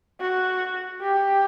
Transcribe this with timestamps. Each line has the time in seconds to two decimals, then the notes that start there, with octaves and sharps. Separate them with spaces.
0.20 F#4
1.01 G4